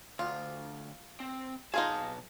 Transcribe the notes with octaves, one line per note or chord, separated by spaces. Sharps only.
D2 F4
C4
B1 D#4 F4 G#4 A5